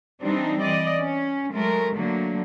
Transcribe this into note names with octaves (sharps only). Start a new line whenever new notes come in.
E3 G3 C4 D4 D#4
E3 D5 D#5
C#4
F#3 G#3 A3 A#4
D3 F#3 A3 A#3